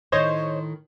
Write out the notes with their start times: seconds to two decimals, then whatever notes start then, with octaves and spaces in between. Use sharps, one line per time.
0.12 A2 D#3 C5 C#5 D#5